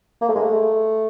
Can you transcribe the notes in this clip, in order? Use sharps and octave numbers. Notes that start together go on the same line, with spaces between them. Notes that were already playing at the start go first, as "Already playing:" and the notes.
A#3
A3
G#3
A3